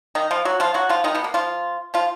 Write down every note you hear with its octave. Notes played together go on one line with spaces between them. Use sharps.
D#3 D#4
F3 F4
F#3 F#4
F3 F4
F#3 F#4
F3 F4
D#3 D#4
B2 B3
A#3
F3 F4
F3 F4